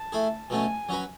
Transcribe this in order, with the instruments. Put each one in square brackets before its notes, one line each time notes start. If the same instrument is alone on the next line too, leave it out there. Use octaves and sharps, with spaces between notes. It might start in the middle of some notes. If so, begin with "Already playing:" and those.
Already playing: [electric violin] A5
[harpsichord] A3 E4 G#4
[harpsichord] B2 F#3 A3 C#4 [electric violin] G#5
[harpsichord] F#3 C#4 F#4 B4